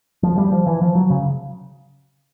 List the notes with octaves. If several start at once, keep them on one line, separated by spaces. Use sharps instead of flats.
F3
G3
F3
E3
F3
F#3
C#3